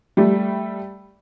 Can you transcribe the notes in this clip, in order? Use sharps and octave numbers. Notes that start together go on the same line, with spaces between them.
G3 A3